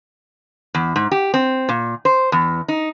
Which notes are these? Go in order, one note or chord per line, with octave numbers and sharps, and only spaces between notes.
E2
G#2
G4
C4
A#2
C5
E2
D#4